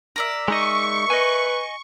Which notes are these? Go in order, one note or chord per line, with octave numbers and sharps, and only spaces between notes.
A#4 D5 E5
G#3 D#4 D#5 C#6
B4 D#5 G#5